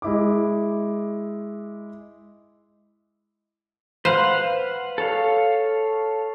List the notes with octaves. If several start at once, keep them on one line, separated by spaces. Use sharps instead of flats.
G#3 E4 D6
B4 C5 F5 F#5
A4 C#5 F5